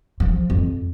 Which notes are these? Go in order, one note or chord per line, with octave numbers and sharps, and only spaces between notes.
F3
F2